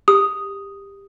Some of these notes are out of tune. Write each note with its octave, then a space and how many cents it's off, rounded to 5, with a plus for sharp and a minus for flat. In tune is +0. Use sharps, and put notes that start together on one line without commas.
G4 +20 D#6 +0